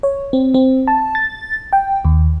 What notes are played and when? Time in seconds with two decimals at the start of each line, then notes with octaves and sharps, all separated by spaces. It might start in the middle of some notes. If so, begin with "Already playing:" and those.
0.03 C#5
0.33 C4
0.54 C4
0.87 A5
1.15 A6
1.73 G5
2.05 D#2